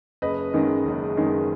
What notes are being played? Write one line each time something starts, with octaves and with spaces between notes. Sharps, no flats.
F#1 B4 D#5
F#2 D#3 G#3
F#1
F#2 D#3 G#3